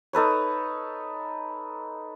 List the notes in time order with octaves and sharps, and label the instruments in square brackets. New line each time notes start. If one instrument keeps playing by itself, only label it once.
[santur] D#4 A4 B4 C#5